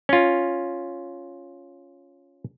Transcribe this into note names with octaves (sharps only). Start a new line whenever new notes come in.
C#4 F4